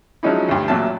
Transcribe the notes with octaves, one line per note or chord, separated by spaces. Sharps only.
F3 F#3 G#3 C#4 D#4 E4
D2 G2
A1 A#2 F#3 E5 A5